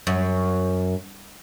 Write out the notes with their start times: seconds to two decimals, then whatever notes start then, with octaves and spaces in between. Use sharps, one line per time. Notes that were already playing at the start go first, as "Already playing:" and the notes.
0.07 F#2